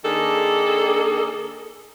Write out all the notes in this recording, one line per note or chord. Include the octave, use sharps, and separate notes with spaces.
D#3 A#3 D4 G#4 A4